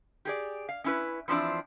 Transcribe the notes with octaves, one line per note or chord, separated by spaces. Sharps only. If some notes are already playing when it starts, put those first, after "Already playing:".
G4 G#4 D5
F5
C#4 E4 B4
E3 F3 C4 D4 E4